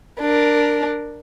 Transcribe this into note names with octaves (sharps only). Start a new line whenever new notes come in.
D4 A#4